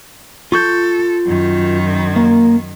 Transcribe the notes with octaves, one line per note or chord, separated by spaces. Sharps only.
F4 A4 C#6 G6
F#2 D#3
A#3